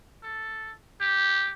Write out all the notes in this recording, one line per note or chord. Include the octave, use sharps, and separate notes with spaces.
A4
G4